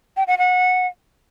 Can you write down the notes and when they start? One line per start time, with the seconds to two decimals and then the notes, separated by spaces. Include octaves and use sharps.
0.17 G5
0.27 F#5
0.38 F#5